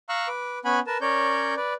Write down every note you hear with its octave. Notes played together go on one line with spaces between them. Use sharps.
F5 A#5 C#6 E6 F#6
B4 D6
B3 C#4 F#5 G#5 B5
A#4 B4 A5
C#4 A#4 C#5 D5 G6
B4 D5